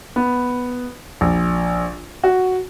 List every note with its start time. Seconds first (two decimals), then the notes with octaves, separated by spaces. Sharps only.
0.16 B3
1.21 A#1
2.23 F#4